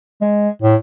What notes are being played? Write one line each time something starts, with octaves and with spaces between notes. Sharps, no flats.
G#3
A2